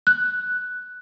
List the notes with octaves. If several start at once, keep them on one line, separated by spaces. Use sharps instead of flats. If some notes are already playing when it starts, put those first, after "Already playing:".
F#6